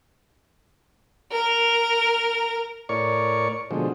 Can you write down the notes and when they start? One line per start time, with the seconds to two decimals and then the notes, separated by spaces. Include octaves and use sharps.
1.31 A#4
2.89 A2 A#4 C#5 D5 C#6
3.71 B2 D3 F3 G#3